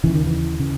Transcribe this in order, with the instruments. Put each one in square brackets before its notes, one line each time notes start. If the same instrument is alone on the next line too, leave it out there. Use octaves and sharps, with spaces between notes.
[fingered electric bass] D#2 C#3 E3
D#3
E3
C#3